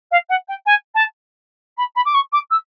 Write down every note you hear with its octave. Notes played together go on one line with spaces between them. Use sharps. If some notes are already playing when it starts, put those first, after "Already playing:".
F5
F#5
G5
G#5
A5
B5
B5
D6
C#6
D6
E6